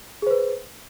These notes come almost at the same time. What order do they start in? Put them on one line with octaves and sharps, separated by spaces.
G#4 C5 B4